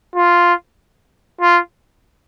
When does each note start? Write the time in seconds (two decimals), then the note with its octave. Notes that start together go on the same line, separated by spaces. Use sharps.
0.16 F4
1.41 F4